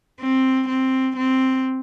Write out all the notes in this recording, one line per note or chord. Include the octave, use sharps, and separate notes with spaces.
C4
C4
C4